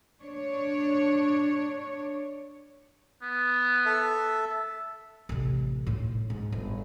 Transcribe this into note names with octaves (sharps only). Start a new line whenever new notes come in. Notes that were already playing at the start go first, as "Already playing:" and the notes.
D4 C#5
B3
A4 E5
A1 C3
A2 D#4
G#2
G1